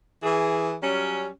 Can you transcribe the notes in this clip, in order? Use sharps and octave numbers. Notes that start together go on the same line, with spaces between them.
E3 G#4
F#3 G3 C#4